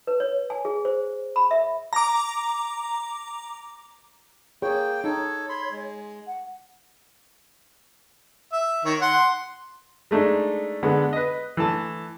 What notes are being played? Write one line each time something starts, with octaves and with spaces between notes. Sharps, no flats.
B4
C#5
G#5
G#4
C5
B5
E5
A#5 D6
A#3 G#4 C#5 G5
D#4 A4 C#5
B5 C6
G#3
F#5
E5
D#3 C#5
F#5 C6
G#3 A3 D4 D#4
D3 G#3 B3
B4 D#5
E3 A3 A5